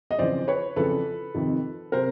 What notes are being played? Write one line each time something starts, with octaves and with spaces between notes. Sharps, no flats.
D#5
F2 C#3 E3 C5 D5
B4 C#5
F2 C#3 E3 A4 B4
F2 C3 D#3
C3 A#4 C5